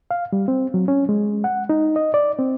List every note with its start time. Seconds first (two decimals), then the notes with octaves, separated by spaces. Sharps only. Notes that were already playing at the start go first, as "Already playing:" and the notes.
0.11 F5
0.33 G3
0.48 C4
0.74 F#3
0.88 C#4
1.09 G#3
1.44 F#5
1.69 D#4
1.96 D#5
2.14 D5
2.39 C4